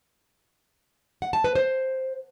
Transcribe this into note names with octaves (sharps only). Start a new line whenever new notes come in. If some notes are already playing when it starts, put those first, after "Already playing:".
F#5
A5
B4
C5